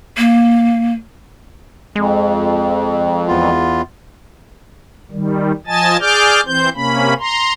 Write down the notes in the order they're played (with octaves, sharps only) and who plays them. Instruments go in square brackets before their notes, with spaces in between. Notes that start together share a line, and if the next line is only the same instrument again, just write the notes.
[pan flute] A#3
[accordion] F2 [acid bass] G#3
[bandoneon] E2 B3 F4
[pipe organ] D#3 G3
F3 D#5 G#5 A5 A6
G#4 D5 D6 F6 G6
E3 C4 C5 G6
C3 A#3 C#4 B5
A#5 C6